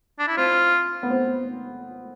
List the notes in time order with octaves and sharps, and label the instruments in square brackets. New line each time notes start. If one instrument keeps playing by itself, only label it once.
[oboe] D4
E4
[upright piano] C4 [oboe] F4
[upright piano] B3
C4